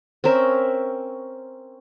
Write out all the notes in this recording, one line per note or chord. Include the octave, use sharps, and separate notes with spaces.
C4 C#4 A#4 E5